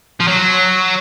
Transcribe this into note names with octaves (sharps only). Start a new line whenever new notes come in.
F3
F#3